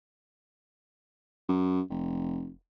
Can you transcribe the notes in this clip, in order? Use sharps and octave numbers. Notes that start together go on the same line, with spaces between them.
F#2
F1